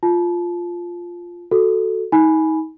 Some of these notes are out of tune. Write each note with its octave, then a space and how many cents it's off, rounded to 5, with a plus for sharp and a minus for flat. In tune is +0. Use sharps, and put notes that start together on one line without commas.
F4 +0 A5 -25
F#4 +0 A4 +0
D#4 +35 G#5 +10 B5 +0